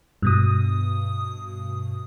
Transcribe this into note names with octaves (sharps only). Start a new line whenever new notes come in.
G2 B2 D#6